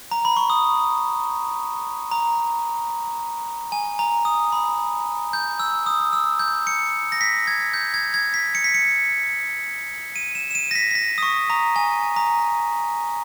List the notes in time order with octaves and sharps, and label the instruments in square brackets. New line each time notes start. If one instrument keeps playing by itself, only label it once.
[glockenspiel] A#5
B5
C#6
D#6
A#5
G#5
A#5
D#6
B5
G6
E6
D#6
E6
G6
C#7
A#6
B6
G#6
G6
G#6
G#6
B6
C#7
B6
C#7
D#7
E7
E7
D#7
A#6
B6
B6
A#6
D#6
C#6
A#5
G#5
A#5